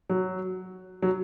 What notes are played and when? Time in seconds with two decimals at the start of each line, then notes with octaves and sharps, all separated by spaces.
0.10 F#3
1.02 F#3